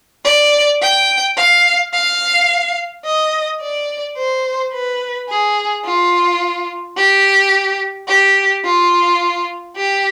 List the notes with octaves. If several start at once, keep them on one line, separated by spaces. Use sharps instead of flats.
D5
G5
F5
F5
D#5
D5
C5
B4
G#4
F4
G4
G4
F4
G4